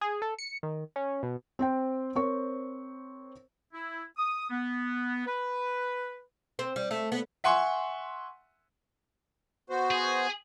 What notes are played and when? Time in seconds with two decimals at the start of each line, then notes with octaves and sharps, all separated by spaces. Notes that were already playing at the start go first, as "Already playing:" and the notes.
0.01 G#4
0.22 A4
0.39 C#7
0.63 D#3
0.96 C#4
1.23 B2
1.59 C4 C5 G5
2.15 C4 A#4 C5 C#5 C#6
3.73 E4
4.17 D#6
4.51 B3
5.26 B4
6.59 C4
6.76 G3
6.91 A3
7.12 B3
7.44 E5 F#5 G#5 C6 C#6
9.70 B3 F#4 C5
9.91 G#4